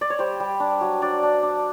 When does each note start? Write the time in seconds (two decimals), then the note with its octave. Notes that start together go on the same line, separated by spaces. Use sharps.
0.01 D5
0.10 C#5
0.19 G3 C5
0.40 G3
0.60 D4
0.81 F#3
1.02 D4 D5
1.23 D4
1.43 D4